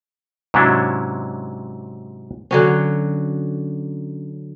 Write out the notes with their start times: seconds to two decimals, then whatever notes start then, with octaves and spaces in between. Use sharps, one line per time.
0.54 G#2 C3 F#3 C#4 D4 E4
2.51 D3 F#3 C#4